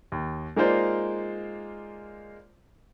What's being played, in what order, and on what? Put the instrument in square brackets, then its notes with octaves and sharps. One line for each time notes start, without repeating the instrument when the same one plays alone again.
[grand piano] D#2
G#3 A#3 D#4 F4 C5 D5